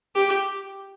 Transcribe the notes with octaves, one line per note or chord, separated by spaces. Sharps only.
G4